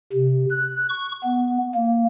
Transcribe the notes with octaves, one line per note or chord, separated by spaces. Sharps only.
C3
F#6
C#6
B3
A#3